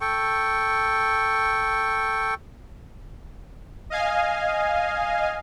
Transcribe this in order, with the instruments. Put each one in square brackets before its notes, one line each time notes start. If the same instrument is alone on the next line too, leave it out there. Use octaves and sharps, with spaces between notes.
[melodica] A4 G5 C#6
[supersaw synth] D#5 F5 G#5